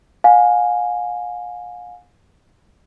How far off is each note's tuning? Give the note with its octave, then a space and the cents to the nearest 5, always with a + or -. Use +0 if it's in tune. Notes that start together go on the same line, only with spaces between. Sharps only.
F5 +40 G#5 +0